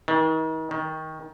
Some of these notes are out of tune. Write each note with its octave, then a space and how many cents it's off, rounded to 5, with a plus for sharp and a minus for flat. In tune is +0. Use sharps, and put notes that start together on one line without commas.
D#3 +40
D#3 +20